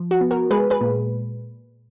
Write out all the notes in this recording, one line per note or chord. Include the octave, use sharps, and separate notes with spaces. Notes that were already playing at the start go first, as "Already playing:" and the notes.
Already playing: F3
F#4
B3
F#4 A#4
G#3 G#4 B4
G#4 B4
A#2